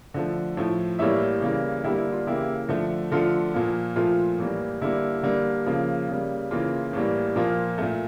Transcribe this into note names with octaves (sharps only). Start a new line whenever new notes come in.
D3 F3 A3
A2 F3 A3
A2 E3 G3 A#3 C#5 E5
C#3 E3 G3 A#3
D3 G3 A#3 E4 G4
E4
F4
C#3 E3 A#3 E4 G4
D3 F3 A3
D3 F3 A3 F4 A4
A#2 F3 A#3
A#2 F3 A3 F4
A2 E3 G3 A#3
D3 G3 A#3 E4
D3 G3 A#3
C#3 F3 A#3
C#3 G3 A#3
C#3 E3 A#3 F4
A2 E3 G3 A#3
A#2 F3 A#3 F4
A#2 A3